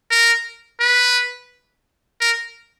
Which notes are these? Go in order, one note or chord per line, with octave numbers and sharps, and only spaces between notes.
A#4
B4
A#4